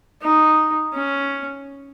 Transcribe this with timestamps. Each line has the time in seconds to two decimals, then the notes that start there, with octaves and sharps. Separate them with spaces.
0.22 D#4
0.94 C#4